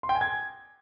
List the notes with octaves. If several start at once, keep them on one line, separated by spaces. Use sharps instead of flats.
C6
G5
G#5
G#6